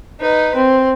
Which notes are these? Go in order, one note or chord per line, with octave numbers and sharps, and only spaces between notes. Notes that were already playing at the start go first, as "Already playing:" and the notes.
D#4 B4
C4